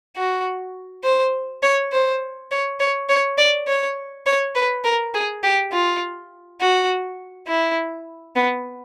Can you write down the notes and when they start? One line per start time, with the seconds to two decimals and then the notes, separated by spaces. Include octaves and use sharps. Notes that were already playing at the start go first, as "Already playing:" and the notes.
0.17 F#4
1.04 C5
1.63 C#5
1.92 C5
2.51 C#5
2.80 C#5
3.09 C#5
3.38 D5
3.67 C#5
4.26 C#5
4.55 B4
4.84 A#4
5.14 G#4
5.43 G4
5.72 F4
6.61 F#4
7.47 E4
8.36 B3